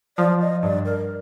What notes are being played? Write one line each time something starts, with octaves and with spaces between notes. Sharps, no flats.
F3 D5
D#5
G2 D5
A#4